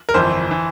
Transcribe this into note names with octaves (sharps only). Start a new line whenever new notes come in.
A#4
G1 F2 E3 C5
E3